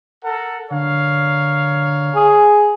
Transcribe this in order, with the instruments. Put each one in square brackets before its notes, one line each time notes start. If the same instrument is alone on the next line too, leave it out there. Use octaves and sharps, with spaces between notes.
[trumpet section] A4 A#4 F#5
[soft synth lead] D3 [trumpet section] A#4 C#5 F5
[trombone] G#4